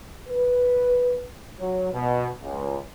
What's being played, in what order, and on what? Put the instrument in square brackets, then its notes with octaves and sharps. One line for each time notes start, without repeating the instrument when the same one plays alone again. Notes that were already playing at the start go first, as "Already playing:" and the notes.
[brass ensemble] B4
F#3
B2
C#2